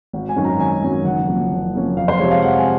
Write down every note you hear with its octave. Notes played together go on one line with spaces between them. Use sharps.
G#1
G#5
F#2 D#3 F#3 C#4
A#5
G#1 G#5
F#2 D#3 F#3 C#4
F#1 F#5
F#2 F3 A#3 C#4
F#1
F#2 F3 A#3 C#4
F2 F5
C5
C3 F3 G#3 C#5
F5
F2 F#5
G#5